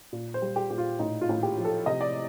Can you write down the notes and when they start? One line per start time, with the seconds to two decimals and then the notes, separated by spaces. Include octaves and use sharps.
0.13 A#2
0.34 C5
0.42 G3
0.56 G4
0.70 A#2 G4
0.78 F4
0.99 A2 D#4
1.21 F4
1.29 A2
1.43 G4
1.58 F3
1.65 A4
1.86 C3 D#5
2.01 D5